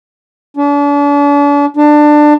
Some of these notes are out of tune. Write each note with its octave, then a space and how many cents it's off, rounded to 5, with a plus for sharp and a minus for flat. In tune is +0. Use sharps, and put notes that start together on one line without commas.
D4 -40
D4 +20